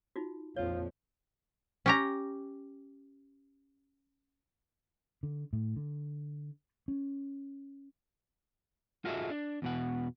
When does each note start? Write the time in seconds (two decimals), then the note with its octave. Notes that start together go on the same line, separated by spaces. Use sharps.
0.16 D#4 F4 F#4
0.56 A#1 F2 F3 F4 C#5
1.86 C#4 G4 A#5
5.23 D3
5.53 A2
5.76 D3
6.88 C#4
9.05 F4 F#4 G#4 A4 D#5 E5
9.30 D4
9.62 E2 B2 F#5